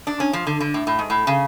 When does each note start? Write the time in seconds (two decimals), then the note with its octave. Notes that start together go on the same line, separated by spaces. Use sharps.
0.07 D4
0.20 C#4
0.33 F3
0.47 D3
0.60 D3
0.74 A2
0.87 A2
0.99 G#2
1.10 A2
1.27 C#3